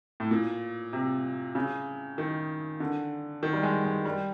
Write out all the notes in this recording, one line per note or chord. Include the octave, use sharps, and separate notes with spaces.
A2
A#2
C3
C#3
D#3
D3
D#3
G3
G#3
G#3
G3